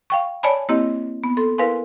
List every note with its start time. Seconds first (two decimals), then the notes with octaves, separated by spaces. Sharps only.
0.10 F5 G5 C#6
0.43 C#5 D5 G#5 A5 B5
0.69 A#3 C4 E4 G4 D#5
1.24 B3
1.37 A4 C6
1.58 E4 A#4 B4 F5 G#5 C6